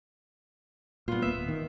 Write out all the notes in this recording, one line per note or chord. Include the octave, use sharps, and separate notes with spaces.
G2 A#2 B3 F4
E1 A#3 B3 E5
D1
D#3